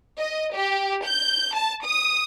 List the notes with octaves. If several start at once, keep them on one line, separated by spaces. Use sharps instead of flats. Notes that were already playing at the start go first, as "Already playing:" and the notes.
D#5
G4
G6
A5
D#6